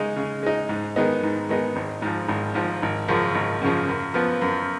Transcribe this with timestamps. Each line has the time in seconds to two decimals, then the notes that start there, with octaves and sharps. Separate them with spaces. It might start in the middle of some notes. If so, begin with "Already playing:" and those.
Already playing: C#3 G#3 D#4
0.16 C#3
0.43 G#3 D#4
0.69 G#2
0.96 D#3 G#3 B3 D#4
1.23 G#2
1.49 D#3 G#3 B3 D#4
1.76 G#1
2.02 G#2 F3
2.28 G#1
2.55 G#2 F3
2.82 G#1
3.08 F#2 C#3 F3
3.35 G#1
3.62 F#2 C#3 F3
3.89 F#2
4.14 F3 B3
4.41 F#2